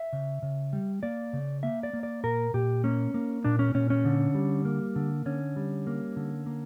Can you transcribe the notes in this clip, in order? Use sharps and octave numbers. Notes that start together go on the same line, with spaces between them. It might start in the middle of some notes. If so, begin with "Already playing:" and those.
Already playing: E5
C#3
C#3
G3
A#3 D5
C#3
A#3 E5
D5
A#3
D5
A#2 A#4
A#2 G4
A#3 C#4
A#3
A#2 D4
C#4
A#2 C#4
C#4
D3
G3
A#3
D3
D3 C#4
G3
A#3
D3
A#3